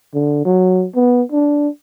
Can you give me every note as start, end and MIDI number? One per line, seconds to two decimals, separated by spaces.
0.14 0.44 50
0.45 0.86 54
0.95 1.22 59
1.32 1.68 62